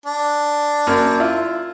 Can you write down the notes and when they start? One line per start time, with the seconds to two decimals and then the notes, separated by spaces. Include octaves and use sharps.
0.06 D4
0.87 F#2 A#3
1.20 E4 F4